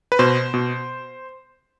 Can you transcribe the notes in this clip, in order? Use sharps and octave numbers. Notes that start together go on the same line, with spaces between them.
B4
B2 C5
B2